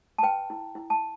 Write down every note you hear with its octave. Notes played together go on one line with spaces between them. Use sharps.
A5
B4 G5
E4
E4
A5